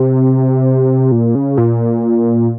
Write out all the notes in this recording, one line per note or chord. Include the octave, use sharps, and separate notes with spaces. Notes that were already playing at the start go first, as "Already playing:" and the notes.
Already playing: C3
A#2
C#3
A#2